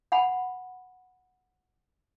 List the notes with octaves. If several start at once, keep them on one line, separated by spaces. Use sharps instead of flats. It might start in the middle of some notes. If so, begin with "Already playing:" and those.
F#5 G#5 B5